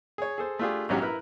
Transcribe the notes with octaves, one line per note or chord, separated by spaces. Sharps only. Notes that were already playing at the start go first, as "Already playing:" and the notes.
G#4 C#5
G#4 A4 C5
A3 D4 F4 G4 G#4
A#1 G#2 F#3 C#4 G4
E4 A#4 B4